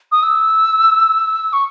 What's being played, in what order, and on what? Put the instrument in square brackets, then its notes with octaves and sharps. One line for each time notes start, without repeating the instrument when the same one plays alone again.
[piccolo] D#6
E6
C#6